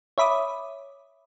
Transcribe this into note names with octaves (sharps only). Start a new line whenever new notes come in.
C#5 E5 B5 D6 D#6